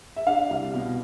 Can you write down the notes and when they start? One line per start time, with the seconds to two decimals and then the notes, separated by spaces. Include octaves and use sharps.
0.16 E5
0.27 D4 F5
0.50 C2
0.74 B2